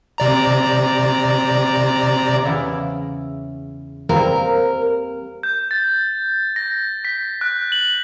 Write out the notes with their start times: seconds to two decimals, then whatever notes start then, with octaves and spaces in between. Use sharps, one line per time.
0.18 C3 D5 A#5
2.45 E2 C#3 E4
4.09 G3 A#3 C4 A#4
5.43 G6
5.71 A6
6.56 A#6
7.05 B6
7.41 F#6
7.72 F#7